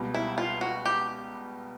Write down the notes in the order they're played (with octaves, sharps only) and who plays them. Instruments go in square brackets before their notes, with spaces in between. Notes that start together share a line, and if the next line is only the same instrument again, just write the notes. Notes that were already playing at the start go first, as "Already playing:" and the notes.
Already playing: [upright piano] C#2 B2 G3
[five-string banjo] E4
F4
F#4
G4